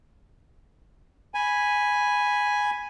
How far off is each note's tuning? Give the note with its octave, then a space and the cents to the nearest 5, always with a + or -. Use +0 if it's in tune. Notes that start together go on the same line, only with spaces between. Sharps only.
G#5 +0 B5 -5